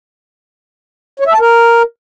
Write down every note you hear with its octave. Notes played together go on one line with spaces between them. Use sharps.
C#5
E5
A5
A#4